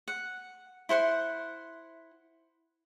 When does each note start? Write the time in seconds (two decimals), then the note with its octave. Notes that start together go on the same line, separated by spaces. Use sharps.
0.08 F#5
0.89 E4 C5 F#5 C6